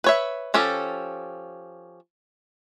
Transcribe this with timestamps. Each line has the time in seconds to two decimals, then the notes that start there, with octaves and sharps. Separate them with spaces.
0.04 B4 C#5 E5
0.54 F3 C#4 G4 A4